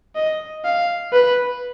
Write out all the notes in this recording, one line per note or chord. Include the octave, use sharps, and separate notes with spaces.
D#5
F5
B4